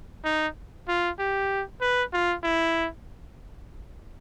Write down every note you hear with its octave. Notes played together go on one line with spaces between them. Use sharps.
D#4
F4
G4
B4
F4
E4